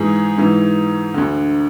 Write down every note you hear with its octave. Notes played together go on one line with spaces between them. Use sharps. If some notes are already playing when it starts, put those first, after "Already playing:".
Already playing: G#2 E3 G#4
G#2 E3
D2 D3